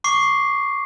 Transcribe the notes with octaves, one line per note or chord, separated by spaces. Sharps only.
C#6 D6 C7